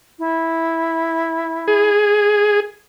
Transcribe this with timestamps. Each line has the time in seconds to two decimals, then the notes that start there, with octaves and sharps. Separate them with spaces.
0.19 E4
1.68 G#4